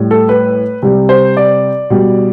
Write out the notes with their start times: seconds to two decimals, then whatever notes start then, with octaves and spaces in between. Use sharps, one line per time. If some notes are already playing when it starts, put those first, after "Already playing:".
Already playing: A2 G3
0.11 A4
0.29 B4
0.83 C3 G3
1.09 C5
1.37 D5
1.90 B2 G3